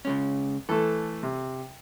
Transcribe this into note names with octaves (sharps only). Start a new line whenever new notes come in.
C#3 G#3 C#4
E3 A3 A4
C3